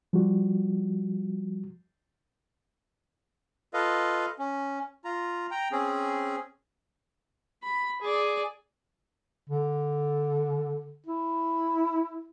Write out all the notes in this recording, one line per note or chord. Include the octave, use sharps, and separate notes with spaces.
F3 G3 F#4
F4 A4 B4 D#5 F5
C#4
F4 A#5
G5 A#5
C4 C#4 G#4
B5
G#4 D5
D3
E4